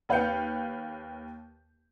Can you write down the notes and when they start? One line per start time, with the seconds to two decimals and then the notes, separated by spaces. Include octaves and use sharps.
0.09 D#2 B4 F5 G5 G6 C#7